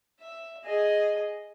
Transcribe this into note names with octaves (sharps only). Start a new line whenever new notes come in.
E5
G#4 D#5